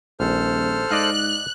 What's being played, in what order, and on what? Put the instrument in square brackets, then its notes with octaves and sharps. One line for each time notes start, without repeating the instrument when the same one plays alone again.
[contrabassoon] D#1 [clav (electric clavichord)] A#1 [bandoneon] A4 C5 F6
[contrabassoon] G#2 [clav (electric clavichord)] D5 D#5 F5 [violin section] F#6